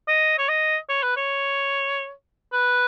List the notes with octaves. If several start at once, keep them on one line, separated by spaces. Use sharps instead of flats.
D#5
C#5
D#5
C#5
B4
C#5
B4